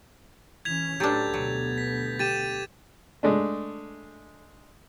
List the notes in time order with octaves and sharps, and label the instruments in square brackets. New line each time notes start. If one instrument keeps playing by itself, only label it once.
[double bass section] E3 C#4 [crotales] G#6 B6 F7
[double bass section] A2 [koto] F#3 D4 [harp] G4 A4 B4 [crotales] G6 A6
[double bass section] D2 B2 B3 [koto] F#3
[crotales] B6
[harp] G4 [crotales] A6 D#7 E7
[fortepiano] G#3 A3 D4